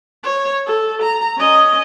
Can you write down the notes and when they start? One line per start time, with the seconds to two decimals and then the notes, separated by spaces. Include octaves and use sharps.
0.24 C#5
0.67 A4
1.02 A#5
1.38 C#4 D#5